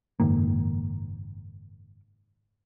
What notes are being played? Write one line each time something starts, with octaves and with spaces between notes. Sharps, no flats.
F#1 G#2 D#3 A#3